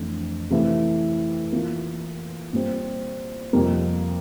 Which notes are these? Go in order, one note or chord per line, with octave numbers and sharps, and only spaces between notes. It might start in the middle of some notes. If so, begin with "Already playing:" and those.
Already playing: F2 E3 A3 D4 A4
C3 E3 A3 E4 A4
E3 A#3 F4
A#2 G3 C4
F2 C3 G3 A#3 F4